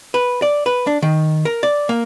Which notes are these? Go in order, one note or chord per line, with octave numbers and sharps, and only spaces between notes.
B4
D5
B4
D4
D#3
A#4
D5
A#3